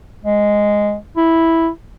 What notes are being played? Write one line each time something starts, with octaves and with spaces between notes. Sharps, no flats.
G#3
E4